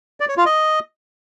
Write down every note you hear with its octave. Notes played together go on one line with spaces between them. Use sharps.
D5
C#5
F4
D#5